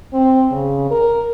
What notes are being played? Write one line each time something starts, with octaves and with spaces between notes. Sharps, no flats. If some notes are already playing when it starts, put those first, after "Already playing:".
C4
C#3
A#4